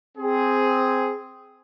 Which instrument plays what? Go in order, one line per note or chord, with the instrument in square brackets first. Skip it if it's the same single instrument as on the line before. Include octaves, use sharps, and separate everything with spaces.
[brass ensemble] C4 G#4